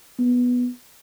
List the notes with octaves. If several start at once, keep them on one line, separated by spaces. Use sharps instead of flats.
B3